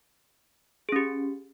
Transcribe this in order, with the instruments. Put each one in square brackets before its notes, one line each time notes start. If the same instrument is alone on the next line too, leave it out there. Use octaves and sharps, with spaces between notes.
[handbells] G#4
C#4
G4